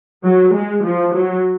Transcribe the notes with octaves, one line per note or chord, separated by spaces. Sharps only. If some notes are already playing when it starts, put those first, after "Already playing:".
F#3
G#3
F3
F#3